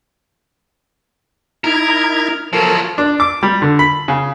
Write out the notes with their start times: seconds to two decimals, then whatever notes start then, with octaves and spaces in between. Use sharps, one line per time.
1.64 D#4 E4 A#4 G#6
2.53 F3 F#3 A4 A#4
2.98 D4
3.20 D6
3.43 G3
3.62 D3
3.79 B5
4.08 C#3